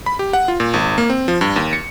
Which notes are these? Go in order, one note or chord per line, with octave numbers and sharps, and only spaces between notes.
B5
G4
F#5
F4
A#2
G#1
A#3
C4
F3
G2
D#2
C#7